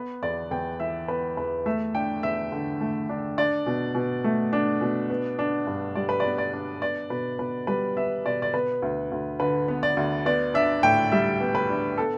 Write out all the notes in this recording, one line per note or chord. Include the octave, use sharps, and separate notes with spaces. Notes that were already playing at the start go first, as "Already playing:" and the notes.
Already playing: B3 B4
E2 D5
E2 G5
E3 E5
B3 B4
E2 B4
A3 E5
D4 G5
E2 E5
D3
A3
D4
D4 D5
B2
B2
A3
D4
B2
B3
D4
G2
G3 D5
B4
B3 D5
D5
D4
B3 D5
B2 B4
B2 B4
G3 B4
B3 E5
B2 D5
D5
B3 B4
D2
D2
D3 B4
B3
D5
D2
B3 D5
D4 E5
A2 G5
G3 E5
B3
B4
D4
B3 A4